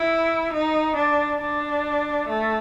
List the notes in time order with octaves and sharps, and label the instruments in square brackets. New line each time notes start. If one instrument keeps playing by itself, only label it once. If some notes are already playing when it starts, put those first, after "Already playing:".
Already playing: [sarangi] E4
D#4
D4
D4
A3